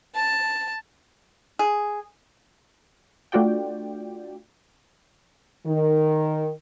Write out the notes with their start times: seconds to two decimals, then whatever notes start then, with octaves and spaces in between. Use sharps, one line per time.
0.15 A5
1.59 G#4
3.32 A3 D4 F4 F#4 D5 G5
5.66 D#3